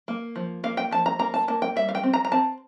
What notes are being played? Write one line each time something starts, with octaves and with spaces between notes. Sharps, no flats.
A#3
F3
A#3 F5
G5
F3 A5
A#5
A#3 A#5
A5
A#3 A5
G5
G3 E5
F5
G5
C4
A#5
A#5
C4 A5